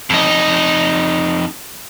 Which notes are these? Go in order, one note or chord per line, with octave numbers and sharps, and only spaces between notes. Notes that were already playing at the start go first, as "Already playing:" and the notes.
F2 D#4